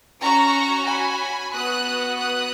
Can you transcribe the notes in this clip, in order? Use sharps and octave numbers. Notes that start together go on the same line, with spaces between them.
C#4 F#4 A#5 C#6
G#5 B5
B3 F#4 D#6 F#6
D#6 F#6